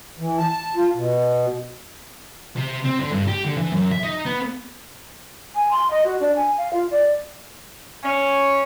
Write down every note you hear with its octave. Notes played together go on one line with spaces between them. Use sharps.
E3
A5
F4
B2
C3
C4
D3
G2
G4
D3
E3
F#2
E5
D#4
B3
G#5
C6
D#5
F#4
D4
G#5
F5
F4
D5
C#4